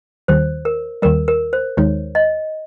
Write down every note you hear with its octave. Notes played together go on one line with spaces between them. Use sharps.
D#2 D#3 G3 C5
A#4
D#2 D#3 G3 A#4
A#4
C5
D#2 D#3 G#3 D#4 C#5
D#5